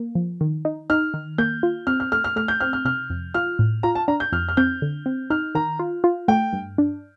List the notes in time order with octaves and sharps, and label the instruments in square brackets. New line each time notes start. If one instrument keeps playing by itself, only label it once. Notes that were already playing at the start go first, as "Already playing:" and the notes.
Already playing: [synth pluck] A#3
F3
D#3
D#4
[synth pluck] D#4 [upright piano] F6
[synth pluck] D#3
[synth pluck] A#3 [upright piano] G6
[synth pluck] F4
[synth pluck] C4 [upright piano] F6
[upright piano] F6
[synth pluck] A3 [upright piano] F6
[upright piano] F6
[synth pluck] A3 [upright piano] F6
[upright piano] G6
[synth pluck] C4 [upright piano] F6
[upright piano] F6
[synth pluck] C3 [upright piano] F6
[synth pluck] F2
[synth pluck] F4 [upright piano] F6
[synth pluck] A2
[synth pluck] F4 [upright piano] A#5
[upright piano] A5
[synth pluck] D4 [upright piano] A#5
[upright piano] G6
[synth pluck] F2 [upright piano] F6
[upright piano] F6
[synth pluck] C4 [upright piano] G6
[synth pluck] D3
C4
[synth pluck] D#4 [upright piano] F6
[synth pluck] D#3 [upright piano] A#5
[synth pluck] F4
F4
[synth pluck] A3 [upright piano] G5
[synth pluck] G2
D4